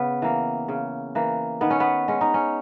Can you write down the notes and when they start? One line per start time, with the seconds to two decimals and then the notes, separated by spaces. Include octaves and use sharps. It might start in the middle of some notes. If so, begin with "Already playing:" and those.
Already playing: C#3 B3
0.22 E3 A#3
0.68 C#3
1.15 E3 A#3
1.61 D#3 B3
1.70 C#4
1.80 B3
2.08 G#3 C#4
2.21 D#4
2.34 C#4